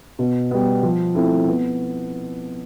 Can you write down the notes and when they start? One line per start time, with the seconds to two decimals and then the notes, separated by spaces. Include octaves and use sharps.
0.19 B2
0.51 G3 B3
0.83 F3
1.15 A3 C4 E4
1.48 B3